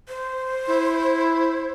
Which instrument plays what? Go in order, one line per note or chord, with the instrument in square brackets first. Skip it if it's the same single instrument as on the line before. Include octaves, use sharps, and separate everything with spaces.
[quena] C5
[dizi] E4